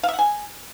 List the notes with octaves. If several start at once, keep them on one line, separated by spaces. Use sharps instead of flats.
F5
E5
F#5
G#5